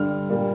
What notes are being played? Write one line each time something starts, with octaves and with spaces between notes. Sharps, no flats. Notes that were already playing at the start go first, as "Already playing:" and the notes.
Already playing: G2 D3 G3 F6
A#2 G3 A#3